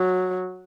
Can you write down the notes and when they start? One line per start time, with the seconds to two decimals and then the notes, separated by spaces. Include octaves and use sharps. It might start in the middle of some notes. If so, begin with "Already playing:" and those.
Already playing: F#3